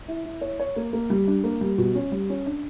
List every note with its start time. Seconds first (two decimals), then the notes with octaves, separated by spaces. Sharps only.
0.08 E4
0.25 E4
0.41 C#5
0.60 C#5
0.76 A#3
0.93 A#3
1.10 G3
1.27 D4
1.44 A#3
1.61 G3
1.78 B2
1.95 C#4
2.12 G3
2.30 C#4
2.46 D4